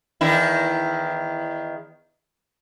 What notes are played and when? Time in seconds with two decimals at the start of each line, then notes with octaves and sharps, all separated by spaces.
0.21 E2 D#3 E4